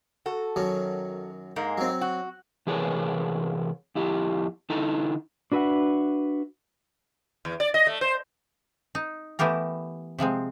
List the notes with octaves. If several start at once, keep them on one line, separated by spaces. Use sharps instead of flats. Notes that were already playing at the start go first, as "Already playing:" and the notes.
F#4 A4
F#2 D#3 F#3
G#2 G#3 A#3
F#3 C4
F#4
C3 E3 G#4 A#4 B4 C#5
F2 E4 G4
D3 D#4 E4 A4 A#5
D4 F#4 B4 D#5 E5 F#5
E2
D5
D#5
A3
C5
D#4
E3 A3 B3 G4 A#4
C3 F3 G#3 C4